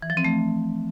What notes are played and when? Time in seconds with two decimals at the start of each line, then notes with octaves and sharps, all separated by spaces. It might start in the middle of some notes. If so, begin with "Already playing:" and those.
0.02 E3
0.10 F3
0.17 C4
0.24 A3